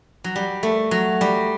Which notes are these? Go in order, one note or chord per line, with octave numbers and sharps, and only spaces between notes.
F#3
G3
A3
F#3
G3